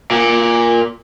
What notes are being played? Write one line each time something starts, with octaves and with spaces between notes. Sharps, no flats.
A#2